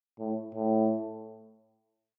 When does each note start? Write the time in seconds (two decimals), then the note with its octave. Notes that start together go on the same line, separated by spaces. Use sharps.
0.19 A2
0.55 A2